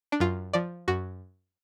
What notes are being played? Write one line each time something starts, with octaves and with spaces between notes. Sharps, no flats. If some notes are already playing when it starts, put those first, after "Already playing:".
D4
F#2 F4
F3 D5
F#2 F#4